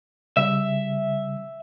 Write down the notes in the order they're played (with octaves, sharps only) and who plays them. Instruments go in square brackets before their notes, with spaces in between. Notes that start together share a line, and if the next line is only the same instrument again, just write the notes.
[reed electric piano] C#3 G3 E6 [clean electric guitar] E5